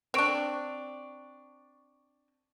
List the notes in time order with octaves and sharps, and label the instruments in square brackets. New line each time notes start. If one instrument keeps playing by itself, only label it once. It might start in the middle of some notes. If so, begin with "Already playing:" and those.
[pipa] C4 D4 [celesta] C#6 D7 F7